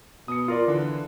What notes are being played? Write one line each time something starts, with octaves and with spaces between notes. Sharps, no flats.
B2 D#6 C#7
F4 A#4 D5
D3 E3